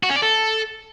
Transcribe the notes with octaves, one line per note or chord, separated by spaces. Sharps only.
F#4
C#4
D5
A4